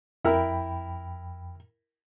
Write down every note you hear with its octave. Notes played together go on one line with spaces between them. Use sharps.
F2 E4 A#4 G5 B5